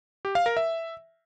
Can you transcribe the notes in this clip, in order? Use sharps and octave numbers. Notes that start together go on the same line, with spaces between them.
G4
F5
A#4
E5